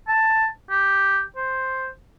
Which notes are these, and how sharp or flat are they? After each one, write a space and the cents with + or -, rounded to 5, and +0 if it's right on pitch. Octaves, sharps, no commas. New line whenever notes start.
A5 +10
G4 +0
C5 +5